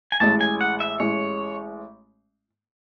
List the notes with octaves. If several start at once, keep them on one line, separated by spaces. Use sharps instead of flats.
G#5
A1 A2 G#3 A5
G#5
F#5
E5
A1 A2 G#3 C#5